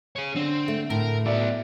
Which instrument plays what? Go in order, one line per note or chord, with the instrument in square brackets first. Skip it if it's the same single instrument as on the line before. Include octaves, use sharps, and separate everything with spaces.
[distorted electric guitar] G#4 C#5
[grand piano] D3 [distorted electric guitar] C4
[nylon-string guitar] A3
[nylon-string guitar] A2 [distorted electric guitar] A#4
[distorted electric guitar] F#3 B3 [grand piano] D5 E5